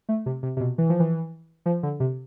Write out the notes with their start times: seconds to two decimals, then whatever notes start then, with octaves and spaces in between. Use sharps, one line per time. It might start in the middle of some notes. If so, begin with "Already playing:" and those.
0.09 A3
0.26 C3
0.43 C3
0.57 C3
0.60 B2
0.78 E3
0.89 F3
1.00 E3
1.66 F3
1.83 D3
2.00 C3